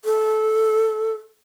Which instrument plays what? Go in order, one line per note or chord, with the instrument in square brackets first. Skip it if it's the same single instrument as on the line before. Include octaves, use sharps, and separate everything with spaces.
[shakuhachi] A4